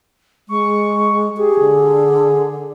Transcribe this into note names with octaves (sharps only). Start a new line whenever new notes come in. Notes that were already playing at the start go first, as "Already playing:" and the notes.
G#3 C#6
G4 G#4
D3